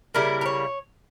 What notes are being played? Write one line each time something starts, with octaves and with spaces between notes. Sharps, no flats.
C#3 G3 A#3 E4 A#4
A#4
C#5